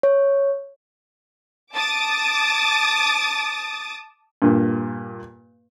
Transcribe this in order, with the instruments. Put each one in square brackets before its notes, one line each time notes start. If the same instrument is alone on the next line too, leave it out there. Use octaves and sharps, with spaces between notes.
[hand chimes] C#5
[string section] A5 D6 D#6 A6
[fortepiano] G2 A#2